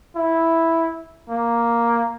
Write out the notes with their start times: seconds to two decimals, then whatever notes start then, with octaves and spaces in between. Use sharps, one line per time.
0.16 E4
1.30 A#3